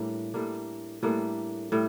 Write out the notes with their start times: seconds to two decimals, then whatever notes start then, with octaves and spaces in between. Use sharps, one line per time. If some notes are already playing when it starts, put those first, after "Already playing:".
Already playing: A2 G3 A#3 D4
0.34 A2 G3 A#3 D4
1.03 A2 G3 A#3 D4
1.72 A2 G3